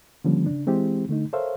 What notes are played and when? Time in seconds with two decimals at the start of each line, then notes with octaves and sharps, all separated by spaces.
0.24 D3 D#3 F3 G3 A#3 C#4
0.46 C#3 D4
0.66 E3 G#3 C4 E4 G4
1.09 D3 A3 D#4
1.33 A4 A#4 C5 C#5 E5 F5